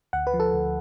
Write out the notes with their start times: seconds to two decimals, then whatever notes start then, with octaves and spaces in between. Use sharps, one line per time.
0.13 D2 F#5
0.27 B4
0.34 F3
0.40 A4
0.53 D2